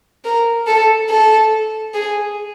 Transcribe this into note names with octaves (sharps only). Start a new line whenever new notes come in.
A#4
A4
A4
G#4